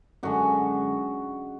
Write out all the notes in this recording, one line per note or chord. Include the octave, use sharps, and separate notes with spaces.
F#2 D3 G#3 F#4